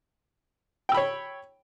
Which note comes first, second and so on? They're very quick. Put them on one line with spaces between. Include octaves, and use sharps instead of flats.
G5 E6 B5 C#5